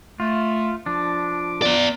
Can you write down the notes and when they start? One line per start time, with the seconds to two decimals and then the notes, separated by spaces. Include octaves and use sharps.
0.20 A3 F4
0.86 F3 D4 D6
1.62 B3 D5